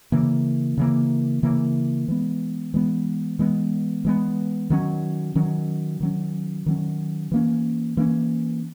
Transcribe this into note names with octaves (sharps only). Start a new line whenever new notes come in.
C#3 E3 A#3
C#3 E3 A#3
C#3 E3 A#3
E3 G#3 B3
E3 G#3 B3
E3 G#3 B3
E3 G#3 B3
D#3 F#3 C#4
D#3 F#3 C#4
D#3 F#3 C#4
D#3 F#3 C#4
E3 A#3 C#4
E3 A#3 C#4